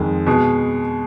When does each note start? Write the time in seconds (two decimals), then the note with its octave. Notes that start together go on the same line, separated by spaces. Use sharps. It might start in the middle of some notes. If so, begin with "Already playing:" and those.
Already playing: F2 D#3 G#3
0.27 B2 G#3